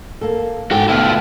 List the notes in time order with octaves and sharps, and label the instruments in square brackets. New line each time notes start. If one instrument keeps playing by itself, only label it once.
[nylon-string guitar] A#3 A4
[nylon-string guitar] G#2 [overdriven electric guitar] F#4 G5 [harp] A4 A5
[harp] D2 B2 G5 [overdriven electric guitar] E4 F4